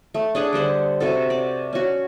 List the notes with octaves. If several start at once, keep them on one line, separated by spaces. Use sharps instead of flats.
A3
D4 G#4 F#5
D3 G3 C5 F#5
C3 F#4 A4
D5
C#4 F#4